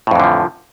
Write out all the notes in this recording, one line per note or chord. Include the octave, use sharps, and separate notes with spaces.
F2 A2 D3 E3 F3